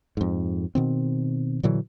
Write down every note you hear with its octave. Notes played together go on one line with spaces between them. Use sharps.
F2 G#2
B2 D#3 C4
A#2 D3 E3 F#3